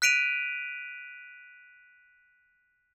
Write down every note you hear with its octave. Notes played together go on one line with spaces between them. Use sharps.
F#6 B6 D7 D#7 F7